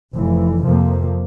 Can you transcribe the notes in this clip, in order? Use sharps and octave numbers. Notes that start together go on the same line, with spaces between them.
F1 F2 E3
F2 C3 F3 A#3